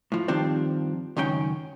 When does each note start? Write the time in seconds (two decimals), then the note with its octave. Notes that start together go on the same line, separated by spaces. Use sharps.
0.12 A2 F3
0.28 G2 D#3 F3 C4 D4
1.17 C#2 F#2 D#3 C#4 G5